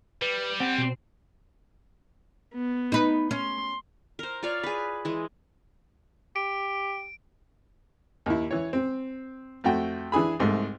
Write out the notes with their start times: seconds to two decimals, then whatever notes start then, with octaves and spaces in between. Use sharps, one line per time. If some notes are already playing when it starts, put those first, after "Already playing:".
0.22 G3 B4
0.60 C4 F#5
0.78 B2
2.54 B3
2.92 D#4 B4
3.31 C#4 C6
4.19 A#4 C5
4.42 F4 C#5 D5 F5
4.63 G#4 B4
5.05 E3 G#3
6.36 G4 D7
8.26 D#2 E4
8.51 E3 C#5
8.73 C4
9.64 F2 A3 F#4 G5
10.12 E3 D4 G#4 B5
10.40 C2 G#2 A3